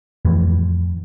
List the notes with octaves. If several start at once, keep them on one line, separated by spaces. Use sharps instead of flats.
F2 A2 E3